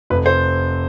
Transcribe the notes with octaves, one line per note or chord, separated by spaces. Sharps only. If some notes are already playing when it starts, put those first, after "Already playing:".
F1 B4
C5